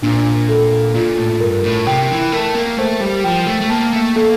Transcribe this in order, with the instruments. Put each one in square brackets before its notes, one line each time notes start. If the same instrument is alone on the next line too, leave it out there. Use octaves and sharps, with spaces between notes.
[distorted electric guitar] A#2 [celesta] D4
[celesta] A4
[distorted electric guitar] A#2 [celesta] F4
[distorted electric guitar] A2
[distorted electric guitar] G2 [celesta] A#4
[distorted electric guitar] A2
[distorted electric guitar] C3 [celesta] G5
[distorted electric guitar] E3
[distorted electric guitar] A3 [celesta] A#4
[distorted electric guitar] A#3
[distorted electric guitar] A3 [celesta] C5
[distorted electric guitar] G3
[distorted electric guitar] F3 [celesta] G5
[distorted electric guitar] A3
A3
[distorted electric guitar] A#3 [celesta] A5
[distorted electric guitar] A3
[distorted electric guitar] A#3 [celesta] A4